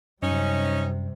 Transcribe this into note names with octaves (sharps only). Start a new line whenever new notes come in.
F#2 C3 G3 C#4 D#4